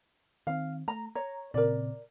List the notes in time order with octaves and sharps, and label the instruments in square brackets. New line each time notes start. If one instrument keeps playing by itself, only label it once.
[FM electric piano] D#3 C4 [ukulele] F5
[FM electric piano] A3 [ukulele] A#5
[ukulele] C#5 [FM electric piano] A#5
[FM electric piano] A#2 C#3 C4 [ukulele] A#4 D5